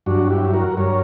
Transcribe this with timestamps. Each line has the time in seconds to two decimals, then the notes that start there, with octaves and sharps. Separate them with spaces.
0.06 G2 F#3 D4 F#4
0.30 E4 G4
0.54 F#4 A#4
0.77 G2 F#3 A#4 C#5